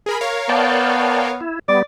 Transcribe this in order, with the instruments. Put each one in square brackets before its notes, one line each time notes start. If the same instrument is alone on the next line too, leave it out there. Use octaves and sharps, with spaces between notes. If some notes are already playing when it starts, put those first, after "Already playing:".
[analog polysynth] G#4 A#4 B5
A#4 C#5 F5
[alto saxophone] B3 [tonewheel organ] D5 G5 A5
[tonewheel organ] E4
[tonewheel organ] G3 B3 [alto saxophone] D5